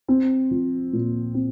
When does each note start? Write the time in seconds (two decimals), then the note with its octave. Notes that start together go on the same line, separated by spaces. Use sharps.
0.08 C4
0.51 F3
0.93 A#2
1.35 C4